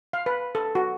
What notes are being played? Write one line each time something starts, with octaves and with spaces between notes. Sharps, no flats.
F5
B4
A4
F#4